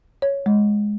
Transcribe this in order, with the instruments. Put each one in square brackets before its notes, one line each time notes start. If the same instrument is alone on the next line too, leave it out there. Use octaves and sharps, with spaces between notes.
[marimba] C#5
G#3